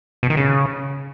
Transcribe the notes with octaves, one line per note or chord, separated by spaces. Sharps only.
B2
D#3
C#3